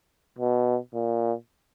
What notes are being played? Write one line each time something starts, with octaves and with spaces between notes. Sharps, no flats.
B2
A#2